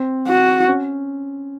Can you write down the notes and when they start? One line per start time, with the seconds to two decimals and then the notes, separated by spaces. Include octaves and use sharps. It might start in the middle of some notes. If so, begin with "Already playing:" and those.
Already playing: C4
0.28 F#4
0.68 C#4